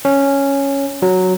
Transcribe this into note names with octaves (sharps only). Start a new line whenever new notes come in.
C#4
F#3